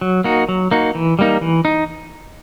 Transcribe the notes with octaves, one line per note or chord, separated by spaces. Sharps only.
F#3
A#3 D#4 F#4
F#3
A#3 D#4 F#4
E3
G3 A#3 D#4
E3
D#4